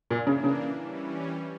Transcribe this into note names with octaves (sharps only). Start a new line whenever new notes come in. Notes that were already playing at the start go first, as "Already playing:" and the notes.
A#2 E3 A#3 D4
C#3
C#3
E3 G3 C#4